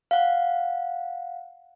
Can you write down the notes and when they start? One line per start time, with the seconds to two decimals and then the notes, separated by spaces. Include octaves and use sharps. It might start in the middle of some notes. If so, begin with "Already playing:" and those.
0.11 F5 F#5